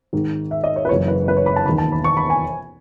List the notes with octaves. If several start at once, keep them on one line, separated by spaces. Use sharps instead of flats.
G#1 G#2 D#3
E5
D#5
C#5
B4
F#1 F#2 E3 C#5
B4
B4
C#5
B5
A5
E1 D#2 D#3 B5
A5
B5
C#6
B5
G#5